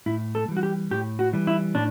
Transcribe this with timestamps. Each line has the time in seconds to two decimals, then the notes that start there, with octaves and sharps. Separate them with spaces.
0.06 A2 E4
0.35 A4
0.48 E3 G3
0.57 F#4
0.63 G4
0.91 A2 G4
1.19 F#4
1.33 E3 G3
1.47 E4
1.75 A2 D4